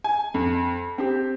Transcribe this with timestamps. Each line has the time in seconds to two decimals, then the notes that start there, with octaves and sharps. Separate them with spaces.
0.04 G#5
0.34 F2
0.98 C4 G4